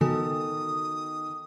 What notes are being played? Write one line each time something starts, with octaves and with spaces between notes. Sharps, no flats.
D#3 B3 F#4 A4 G#5 D#6